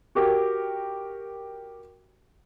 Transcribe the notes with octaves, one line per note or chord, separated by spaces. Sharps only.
F#4 G4 A#4